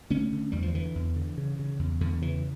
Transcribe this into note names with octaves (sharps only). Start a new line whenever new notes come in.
D3 A3 C#4
D3
E2 G3
F3
D3 E3
E2
D3
C#3
C#3
E2
E2 D3
C#3 E3